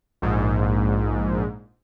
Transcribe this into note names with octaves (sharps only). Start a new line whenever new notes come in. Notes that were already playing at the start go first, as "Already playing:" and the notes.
A#1 G#2